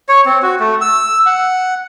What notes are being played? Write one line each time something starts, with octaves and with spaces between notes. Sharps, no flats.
C#5
C4
F#4
A3
E6
F#5